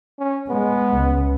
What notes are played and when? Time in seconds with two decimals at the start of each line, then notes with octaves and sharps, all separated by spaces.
0.19 C#4
0.49 G#3 B3
0.95 C#2